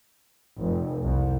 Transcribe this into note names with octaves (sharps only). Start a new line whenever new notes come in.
F1
C2